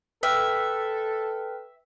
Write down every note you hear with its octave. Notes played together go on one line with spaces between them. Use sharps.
A4 B4 E5 G5 F6